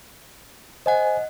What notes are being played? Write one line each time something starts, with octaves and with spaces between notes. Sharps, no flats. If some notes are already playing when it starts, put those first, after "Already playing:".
C5 D#5 F#5 G#5